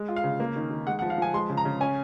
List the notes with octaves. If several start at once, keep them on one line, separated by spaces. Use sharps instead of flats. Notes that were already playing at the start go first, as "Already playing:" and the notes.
Already playing: G#3
F4
F5
C#3
A#3
D#3
D#3
G#3 F#5
F#5
F3
F5
F3 G#5
G#3 C6
C#3
A#5
C#3
C#4 G#5